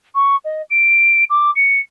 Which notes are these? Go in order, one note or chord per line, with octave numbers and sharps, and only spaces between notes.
C#6
D#5
D7
D6
C#7